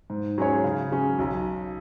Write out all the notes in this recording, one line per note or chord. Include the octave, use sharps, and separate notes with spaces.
G#2
F#3 C#4 G#4 C#5
C#3
F#3 C#4 G#4
B1